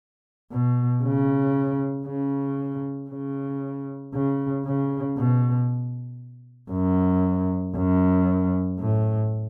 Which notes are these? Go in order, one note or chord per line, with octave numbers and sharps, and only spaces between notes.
B2
C#3
C#3
C#3
C#3
C#3
B2
F#2
F#2
A2